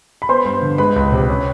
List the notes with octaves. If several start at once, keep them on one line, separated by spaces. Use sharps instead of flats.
B5
B3 C5 C6
G2
D3
G#3 B4 B5
C#2
C3
C#4